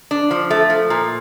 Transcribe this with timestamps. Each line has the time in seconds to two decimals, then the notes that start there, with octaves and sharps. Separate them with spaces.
0.11 D4
0.31 F3
0.50 A3
0.70 F3
0.90 A#2